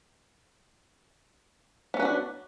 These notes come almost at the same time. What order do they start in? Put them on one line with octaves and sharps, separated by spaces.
B3 C#4 B4 F#4 D4